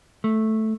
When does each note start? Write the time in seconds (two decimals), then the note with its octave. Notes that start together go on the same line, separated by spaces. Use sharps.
0.24 A3